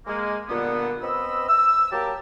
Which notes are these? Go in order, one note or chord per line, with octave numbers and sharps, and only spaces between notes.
G#3 A#3
G2 A#2 D3 A#3 B3
B3 C4 D#5 B5 E6
E6
F#3 A#3 G4 A#4 A5